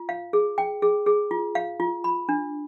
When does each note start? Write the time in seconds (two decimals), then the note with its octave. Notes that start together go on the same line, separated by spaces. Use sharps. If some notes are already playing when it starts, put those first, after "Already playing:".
Already playing: F4
0.09 F5
0.33 G#4
0.58 G5
0.82 G#4
1.06 G#4
1.31 F4
1.55 F5
1.80 F4
2.04 B5
2.29 D4